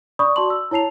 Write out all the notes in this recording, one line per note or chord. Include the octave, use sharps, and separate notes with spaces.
D5 B5 C#6 D#6
F#4 D5 A5 C6 F#7
E6
E4 C#5 A5 C7 F7